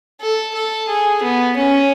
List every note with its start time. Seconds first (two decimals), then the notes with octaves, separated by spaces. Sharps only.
0.21 A4
0.55 A4
0.88 G#4
1.23 B3
1.57 C#4